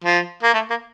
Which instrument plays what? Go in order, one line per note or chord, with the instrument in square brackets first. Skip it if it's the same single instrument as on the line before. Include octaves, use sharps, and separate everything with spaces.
[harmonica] F3
A#3
A3
A#3